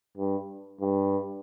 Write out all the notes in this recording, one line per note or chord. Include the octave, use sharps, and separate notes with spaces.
G2
G2